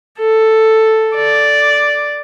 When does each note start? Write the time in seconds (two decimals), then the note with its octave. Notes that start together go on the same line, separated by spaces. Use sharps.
0.20 A4
1.16 D5